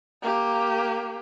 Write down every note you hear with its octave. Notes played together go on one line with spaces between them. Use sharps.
A#3 G4